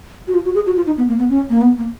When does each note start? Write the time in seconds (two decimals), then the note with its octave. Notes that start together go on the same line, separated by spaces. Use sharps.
0.28 F#4
0.34 F4
0.45 F#4
0.55 G#4
0.66 F#4
0.76 F4
0.87 D#4
0.98 B3
1.09 A#3
1.19 B3
1.30 C#4
1.50 A#3
1.61 B3
1.78 A#3